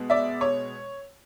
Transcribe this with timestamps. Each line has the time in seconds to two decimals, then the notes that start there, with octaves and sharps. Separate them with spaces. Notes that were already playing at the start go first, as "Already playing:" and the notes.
Already playing: B2 G#3 B3
0.10 D5 E5
0.41 C#5